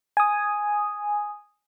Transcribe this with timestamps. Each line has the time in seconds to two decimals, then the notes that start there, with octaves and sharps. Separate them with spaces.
0.17 G#5 D#6